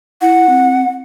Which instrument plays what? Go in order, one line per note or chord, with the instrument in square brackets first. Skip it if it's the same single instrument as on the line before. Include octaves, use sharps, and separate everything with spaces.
[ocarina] E4 [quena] F#5
[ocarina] C4